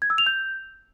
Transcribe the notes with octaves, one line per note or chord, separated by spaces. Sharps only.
G#6
E6
F7
G6